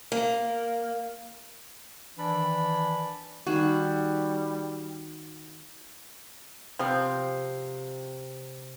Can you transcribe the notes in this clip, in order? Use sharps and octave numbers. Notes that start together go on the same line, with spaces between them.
A#3
D#3 E3 D4 D5 B5
D#3 G3 F#4 G#4
C3 F3 C4